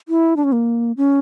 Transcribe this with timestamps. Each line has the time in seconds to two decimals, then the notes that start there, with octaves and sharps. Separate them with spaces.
0.09 E4
0.37 D4
0.44 C#4
0.52 A#3
0.97 C#4